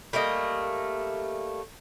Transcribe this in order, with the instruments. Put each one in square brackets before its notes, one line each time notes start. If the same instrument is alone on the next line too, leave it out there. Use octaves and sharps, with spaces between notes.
[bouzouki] G3 A3 A#3 D#5